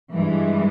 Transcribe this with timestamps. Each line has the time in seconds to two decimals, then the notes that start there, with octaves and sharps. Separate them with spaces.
0.14 G2 E3 G#3